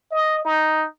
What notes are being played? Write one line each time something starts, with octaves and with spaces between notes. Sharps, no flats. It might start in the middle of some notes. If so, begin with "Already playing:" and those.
D#5
D#4